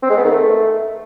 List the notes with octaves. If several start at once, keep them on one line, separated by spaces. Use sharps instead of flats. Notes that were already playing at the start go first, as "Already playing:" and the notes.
C4
G#3
B3
D#3
A3